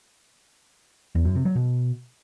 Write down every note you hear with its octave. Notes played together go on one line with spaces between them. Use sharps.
E2
F#2
C3
F#3
B2